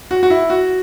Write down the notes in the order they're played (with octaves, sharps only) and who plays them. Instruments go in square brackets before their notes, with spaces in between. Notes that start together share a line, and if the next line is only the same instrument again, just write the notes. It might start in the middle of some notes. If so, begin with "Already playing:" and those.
[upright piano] F#4
F#4
E4
F#4